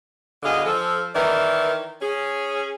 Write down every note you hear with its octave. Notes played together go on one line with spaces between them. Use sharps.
B2 D3 G#4 D#5 F5
F3 A4
D#3 E3 E4 A#4 D5
C#4 G#4